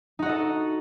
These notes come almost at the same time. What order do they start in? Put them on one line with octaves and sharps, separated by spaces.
D#4 F#4 D#5 A4